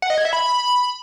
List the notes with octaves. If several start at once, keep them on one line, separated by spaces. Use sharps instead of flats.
F#5
D#5
G#6
E5
B5